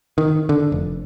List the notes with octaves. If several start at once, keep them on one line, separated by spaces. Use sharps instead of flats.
D#3
D3
F1